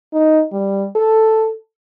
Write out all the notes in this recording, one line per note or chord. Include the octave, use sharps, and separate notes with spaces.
D#4
G3
A4